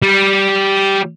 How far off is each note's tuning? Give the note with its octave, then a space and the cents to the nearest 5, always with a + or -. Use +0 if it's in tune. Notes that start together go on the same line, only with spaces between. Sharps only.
G3 -5